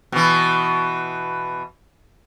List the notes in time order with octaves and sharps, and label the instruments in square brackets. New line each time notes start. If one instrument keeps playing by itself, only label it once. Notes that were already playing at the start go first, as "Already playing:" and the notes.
[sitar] B2 E3